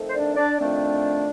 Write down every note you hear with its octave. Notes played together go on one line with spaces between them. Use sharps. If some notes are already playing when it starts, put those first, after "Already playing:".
Already playing: F2 D#3 A3
C5
D4 D5
D4 D5
F2 D#3 A3 C4 D4 D5